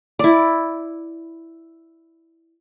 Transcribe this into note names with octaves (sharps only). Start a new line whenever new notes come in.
E4 D5